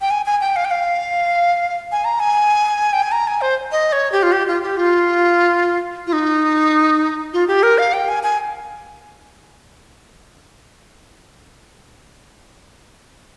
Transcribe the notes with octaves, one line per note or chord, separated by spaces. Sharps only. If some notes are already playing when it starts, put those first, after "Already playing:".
G5
G#5
G#5
G5
F5
G5
F5
G#5
A#5
G#5
G5
G#5
A#5
G#5
C5
D#5
C#5
G4
F4
G4
F4
G4
F4
F4
D#4
F4
G4
A#4
F5
G5
G#5
G#5